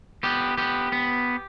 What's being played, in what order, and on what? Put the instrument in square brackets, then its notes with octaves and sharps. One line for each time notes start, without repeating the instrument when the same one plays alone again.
[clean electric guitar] B3 G4
B3 G4
B3